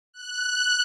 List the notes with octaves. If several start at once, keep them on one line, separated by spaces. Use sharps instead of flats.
F#6